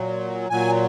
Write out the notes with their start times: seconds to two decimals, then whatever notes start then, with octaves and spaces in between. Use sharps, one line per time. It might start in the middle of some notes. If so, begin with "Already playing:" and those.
Already playing: A#2 F#3
0.50 A#2 F#3 G#5